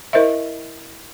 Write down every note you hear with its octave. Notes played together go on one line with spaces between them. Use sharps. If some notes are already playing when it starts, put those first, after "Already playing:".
E4 A#4 C5 D#5 E5